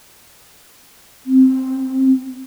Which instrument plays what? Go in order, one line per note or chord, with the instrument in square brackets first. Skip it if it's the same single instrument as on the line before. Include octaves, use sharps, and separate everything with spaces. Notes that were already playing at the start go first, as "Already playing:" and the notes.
[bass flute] C4